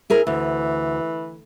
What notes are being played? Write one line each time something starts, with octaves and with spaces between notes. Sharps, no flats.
E4 G#4 A#4
D2 E3